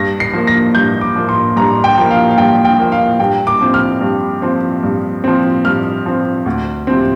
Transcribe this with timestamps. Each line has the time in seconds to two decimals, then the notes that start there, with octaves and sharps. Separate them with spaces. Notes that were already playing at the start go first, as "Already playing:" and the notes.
Already playing: G2 A#6
0.20 C7
0.33 F3 A#3
0.47 A#6
0.75 G2 G6
1.01 D6
1.16 F3 A#3
1.29 C6
1.56 G2 A#5
1.84 G5
1.98 F3 A#3
2.11 F5
2.31 F5
2.38 G2 G5
2.65 G5
2.79 F3 A#3
2.92 F5
3.20 G2 G5
3.47 D6
3.61 F3 C4
3.74 F6
4.01 G2
4.42 F3 C4
4.83 G2
5.24 F3 C4
5.65 G2 F6
6.06 F3 C4
6.46 D2
6.87 C3 F3 C4